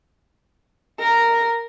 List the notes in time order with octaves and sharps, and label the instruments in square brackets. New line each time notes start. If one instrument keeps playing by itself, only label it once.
[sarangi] A#4